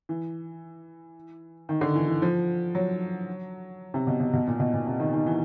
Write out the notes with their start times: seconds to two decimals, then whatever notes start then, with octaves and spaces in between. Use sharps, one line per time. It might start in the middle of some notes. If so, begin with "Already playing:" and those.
0.09 E3
1.69 D#3
1.81 D3
1.95 E3
2.08 E3
2.22 F3
2.75 F#3
3.94 C3
4.07 B2
4.20 B2
4.33 B2
4.47 A#2
4.60 B2
4.74 A#2
4.87 C3
5.00 D#3
5.13 D#3
5.26 E3